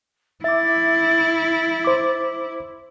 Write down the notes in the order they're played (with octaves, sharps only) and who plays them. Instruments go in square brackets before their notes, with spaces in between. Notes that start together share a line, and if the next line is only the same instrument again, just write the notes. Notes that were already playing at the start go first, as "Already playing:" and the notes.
[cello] E4 [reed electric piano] E5 D6 [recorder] A6
[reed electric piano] C5 D6